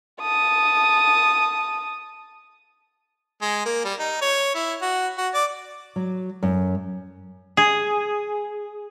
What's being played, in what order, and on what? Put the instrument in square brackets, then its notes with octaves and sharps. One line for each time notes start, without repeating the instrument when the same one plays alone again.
[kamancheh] A5 D#6
[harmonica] G#3
A#3
G3
D#4
C#5
E4
F#4
F#4
D5
[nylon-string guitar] F#3
F#2
[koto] G#4